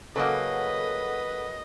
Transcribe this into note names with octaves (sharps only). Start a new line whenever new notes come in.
C#3 F#3 A#3 A4 B4 D#5 F#5